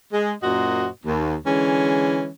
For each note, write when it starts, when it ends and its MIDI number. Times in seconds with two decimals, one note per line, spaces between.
0.12 0.32 56
0.43 0.87 42
0.43 0.87 46
0.43 0.87 66
0.43 0.87 72
0.43 0.87 75
1.06 1.35 39
1.46 2.29 50
1.46 2.29 52
1.46 2.29 56
1.46 2.29 61